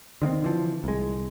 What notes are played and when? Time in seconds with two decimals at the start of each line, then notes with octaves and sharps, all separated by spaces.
0.22 D3 D#3 A3 C4
0.42 D3 E3 F3
0.84 C2 G#3